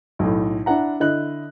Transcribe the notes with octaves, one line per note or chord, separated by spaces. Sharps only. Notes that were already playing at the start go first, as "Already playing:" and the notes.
B1 A2
D4 E4 F#5 A#5
D3 E4 D#5 F#6